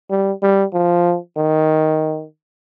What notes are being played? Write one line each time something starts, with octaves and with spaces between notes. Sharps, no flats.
G3
G3
F3
D#3